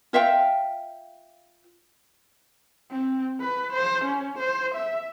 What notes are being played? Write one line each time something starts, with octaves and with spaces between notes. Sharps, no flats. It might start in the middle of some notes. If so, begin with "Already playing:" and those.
F4 E5 F5 G5
C4
B4
C5
C#4
C5
E5